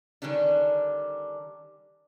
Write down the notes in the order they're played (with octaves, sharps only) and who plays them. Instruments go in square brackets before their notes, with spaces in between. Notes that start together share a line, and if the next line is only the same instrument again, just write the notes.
[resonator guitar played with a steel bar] D3 D#3 G3 C#4 D4